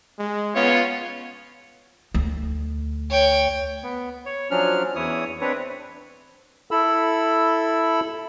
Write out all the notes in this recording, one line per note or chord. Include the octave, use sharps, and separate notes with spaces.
G#3
B3 C#4 F4 C#5
D2
C#5 G5
B3
C#5
F3 F#3 C#4 D4 F6
E2 E3 E4 C#5 D#6
C4 D4 B4 C#5
E4 A4 B5 E6